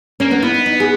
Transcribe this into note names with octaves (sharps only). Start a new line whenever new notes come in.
A#3 C#4
B3
B3 E4
D#4
D#4
G#4